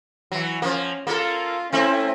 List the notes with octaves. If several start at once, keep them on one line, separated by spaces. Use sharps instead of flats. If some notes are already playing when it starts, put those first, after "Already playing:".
E3 F#3
F3 A#3 C#4
A#3 F4 A4 A#4
A3 C4 C#4 E4